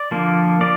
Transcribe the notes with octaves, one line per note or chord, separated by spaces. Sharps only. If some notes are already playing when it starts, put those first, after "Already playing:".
Already playing: D5
D3 F3 A#3
F3 A#3 D5